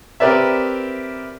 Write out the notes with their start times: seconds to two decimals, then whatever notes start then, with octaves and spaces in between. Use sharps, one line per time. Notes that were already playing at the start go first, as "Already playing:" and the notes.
0.20 C4 G4 A#4 B4 D5 E5